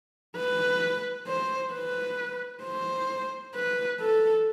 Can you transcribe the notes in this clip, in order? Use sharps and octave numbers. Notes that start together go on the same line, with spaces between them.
B4
C5
B4
C5
B4
A4